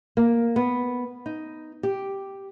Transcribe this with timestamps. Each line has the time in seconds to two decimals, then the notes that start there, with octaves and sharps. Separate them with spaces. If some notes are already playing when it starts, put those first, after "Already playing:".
0.17 A#3
0.56 B3
1.26 D#4
1.83 G4